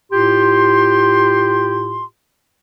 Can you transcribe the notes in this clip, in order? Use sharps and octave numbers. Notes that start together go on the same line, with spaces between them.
A2 F4 G4 C6